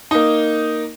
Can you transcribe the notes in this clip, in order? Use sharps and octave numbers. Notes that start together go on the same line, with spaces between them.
A#3 D#4